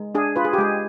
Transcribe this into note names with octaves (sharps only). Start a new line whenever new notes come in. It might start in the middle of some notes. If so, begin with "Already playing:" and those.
Already playing: G#3
D4 G#4
F4 B4
G#4
G4
G#3 G#4